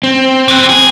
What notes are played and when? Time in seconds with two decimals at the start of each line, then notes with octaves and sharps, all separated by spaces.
0.03 C4
0.48 E3 F#3
0.70 G#4